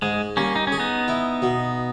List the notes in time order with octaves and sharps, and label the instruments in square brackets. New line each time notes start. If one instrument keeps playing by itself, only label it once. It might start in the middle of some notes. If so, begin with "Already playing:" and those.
[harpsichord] G#2 [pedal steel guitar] G#3
[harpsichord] G3 [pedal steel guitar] A#3 C#4
[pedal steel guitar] D#4
C#4
[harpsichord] G#4
[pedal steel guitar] B3 D#4
[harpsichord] E4
B2